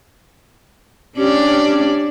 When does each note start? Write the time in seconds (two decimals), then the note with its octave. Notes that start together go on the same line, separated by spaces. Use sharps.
1.18 C#4 D4 G4 D5